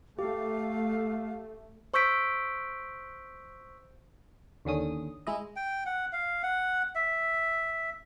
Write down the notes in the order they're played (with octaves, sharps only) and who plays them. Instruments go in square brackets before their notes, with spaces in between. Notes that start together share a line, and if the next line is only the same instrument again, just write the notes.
[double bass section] A3 [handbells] G4 [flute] F5
[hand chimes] C5 C#6 E6 G6 B6 D7
[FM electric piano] D#2 D3 C#4 D#6
G#3 E4 D#5
[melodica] G5
F#5
F5
F#5
E5